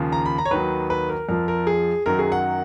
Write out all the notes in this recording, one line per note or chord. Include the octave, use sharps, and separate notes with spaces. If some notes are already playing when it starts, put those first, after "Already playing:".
Already playing: D#2 C#3 F3
A#5
B5
A#5
C#5
D#2 D#3 F#3 B4
B4
A#4
F2 F3 A#4
A#4
G#4
F#2 D#3 F#3 A#4
G#4
F#5